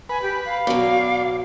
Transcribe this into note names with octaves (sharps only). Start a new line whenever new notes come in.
B4 G#5
G4
F5
B2 F#3 D5